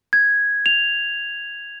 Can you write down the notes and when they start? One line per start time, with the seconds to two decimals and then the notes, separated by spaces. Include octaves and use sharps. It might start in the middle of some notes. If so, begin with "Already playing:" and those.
0.13 G#6
0.66 F7